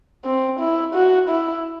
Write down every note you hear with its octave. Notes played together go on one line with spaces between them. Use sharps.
C4
E4
F#4
E4